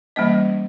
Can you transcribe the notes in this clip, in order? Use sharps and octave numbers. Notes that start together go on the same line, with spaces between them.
E3 G3 A#3 C#4 D#5